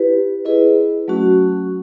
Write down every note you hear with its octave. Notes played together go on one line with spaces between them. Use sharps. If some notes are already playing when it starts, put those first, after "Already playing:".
Already playing: E4 G4 B4
E4 G#4 B4 D#5
F#3 A3 C#4 F#4